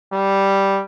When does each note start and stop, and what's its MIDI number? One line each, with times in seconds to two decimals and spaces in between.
0.13 0.82 55